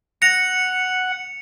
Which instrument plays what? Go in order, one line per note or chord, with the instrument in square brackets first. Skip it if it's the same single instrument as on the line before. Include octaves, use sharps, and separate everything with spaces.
[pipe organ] F#5 [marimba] A#6 [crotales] C#7 F7